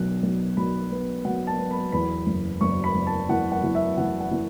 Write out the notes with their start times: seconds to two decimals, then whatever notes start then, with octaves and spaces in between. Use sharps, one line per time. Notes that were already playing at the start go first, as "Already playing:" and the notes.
Already playing: B1 B2 B3 F#6
0.23 B1
0.57 B1 B5
0.91 B3
1.25 F#3 F#5
1.47 A5
1.59 B3
1.71 B5
1.92 E2 B5
2.27 F#1
2.61 F#1 C#6
2.84 B5
2.95 F#1
3.07 A5
3.29 E3 F#5
3.52 F#5
3.63 E3
3.75 E5
3.97 E3 F#5
4.20 F#5
4.31 E3